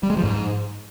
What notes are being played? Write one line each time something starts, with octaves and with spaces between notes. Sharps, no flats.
G3
G#3
F3
G#2